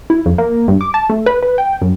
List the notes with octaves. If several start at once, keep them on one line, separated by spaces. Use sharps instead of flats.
E4
F2
A#3
G2
D6
A5
A3
B4
B4
G5
F#2